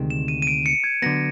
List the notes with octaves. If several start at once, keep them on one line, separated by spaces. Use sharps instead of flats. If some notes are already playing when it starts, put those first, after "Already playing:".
Already playing: D2 C3 D#3 G#3 C4
E7
D#7
D#7
D7
C#7
G#6
D3 F#3 B3 A#6